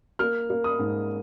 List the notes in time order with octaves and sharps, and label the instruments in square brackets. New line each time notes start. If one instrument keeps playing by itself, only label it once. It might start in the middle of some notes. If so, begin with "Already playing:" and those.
[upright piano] A#3 F6
A#3
D#6
G#2